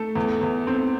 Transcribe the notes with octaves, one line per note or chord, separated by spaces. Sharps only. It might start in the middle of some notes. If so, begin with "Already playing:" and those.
Already playing: A3 A4
E2
E2
C4